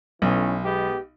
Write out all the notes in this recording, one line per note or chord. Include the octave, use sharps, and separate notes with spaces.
B1 A2 E3 C#4
G#3 B3 G4